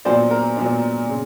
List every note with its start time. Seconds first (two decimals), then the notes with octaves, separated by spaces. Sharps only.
0.05 A#2 F#3 B3 D4 C5 D5
0.31 A#4
0.57 A#2 F#3 B3 D4
1.09 C#3